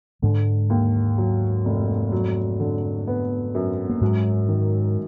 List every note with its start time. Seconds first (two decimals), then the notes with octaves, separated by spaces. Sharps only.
0.22 G#2 D3 G#3
0.70 D#2
1.18 F#3
1.65 F1
2.12 F#3
2.60 D3
3.08 B3
3.55 F#2
3.90 A#3
4.01 G#2 F#3 G#3
4.48 D#3